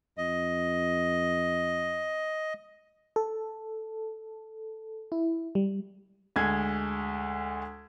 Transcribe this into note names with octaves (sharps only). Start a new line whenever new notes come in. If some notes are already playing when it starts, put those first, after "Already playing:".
F2 D#5
A4
E4
G3
D2 G#3 G#6